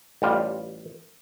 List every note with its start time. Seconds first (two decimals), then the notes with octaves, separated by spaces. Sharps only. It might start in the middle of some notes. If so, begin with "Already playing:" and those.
0.22 A1 G3 F4